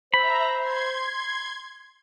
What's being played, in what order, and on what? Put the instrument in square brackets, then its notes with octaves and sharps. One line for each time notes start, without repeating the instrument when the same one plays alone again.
[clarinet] C5 [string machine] E5 A#5 [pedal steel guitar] B5
[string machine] C6 G#6